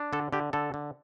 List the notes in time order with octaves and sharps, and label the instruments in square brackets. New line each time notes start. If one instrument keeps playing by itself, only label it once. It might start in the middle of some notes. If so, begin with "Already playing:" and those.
Already playing: [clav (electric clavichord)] D4
D3 A4
D3 G4
D3 A4
D3